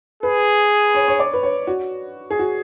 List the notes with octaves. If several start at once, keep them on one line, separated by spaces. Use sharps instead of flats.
G#4 B4
C#5
C#5
D5
B4
C#5
F#4
G#4
F#4